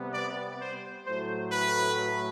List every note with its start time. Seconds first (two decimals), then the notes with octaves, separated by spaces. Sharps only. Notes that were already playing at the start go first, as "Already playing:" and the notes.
Already playing: C3 G3 B3
0.14 D5
0.60 C5
1.06 A2 F#3 A3 C5
1.53 B4